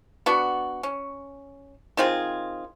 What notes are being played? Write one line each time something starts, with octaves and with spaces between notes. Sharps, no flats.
B3 D4 F#4
C#4
D#3 C4 F4 G#4